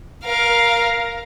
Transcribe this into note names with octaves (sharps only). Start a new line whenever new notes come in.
A#4 F5